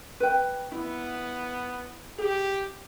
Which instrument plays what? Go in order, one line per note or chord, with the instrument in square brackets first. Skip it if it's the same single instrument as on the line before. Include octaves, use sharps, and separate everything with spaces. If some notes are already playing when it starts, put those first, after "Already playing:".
[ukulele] B4 G5
[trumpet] B3 [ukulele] E4
[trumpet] G4 [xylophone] G#4